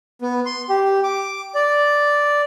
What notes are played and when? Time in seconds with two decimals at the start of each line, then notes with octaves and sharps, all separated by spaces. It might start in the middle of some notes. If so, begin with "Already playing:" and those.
0.22 B3
0.46 C6
0.69 G4
1.04 D6
1.55 D5